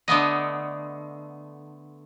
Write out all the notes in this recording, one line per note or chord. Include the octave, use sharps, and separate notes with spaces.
D3 A3 B3 D#5